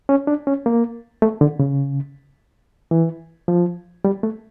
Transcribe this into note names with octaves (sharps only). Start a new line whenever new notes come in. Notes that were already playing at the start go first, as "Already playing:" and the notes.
C#4
D4
C#4
A#3
A3
D3
C#3
E3
F3
G3
A3